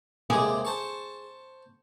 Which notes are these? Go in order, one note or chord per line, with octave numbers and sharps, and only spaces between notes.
D#2 C3 G#3 G#4
C5 A5 C#6